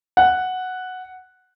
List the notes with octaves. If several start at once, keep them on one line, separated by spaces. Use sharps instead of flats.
F#5